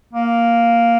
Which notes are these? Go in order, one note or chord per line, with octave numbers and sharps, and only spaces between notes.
A#3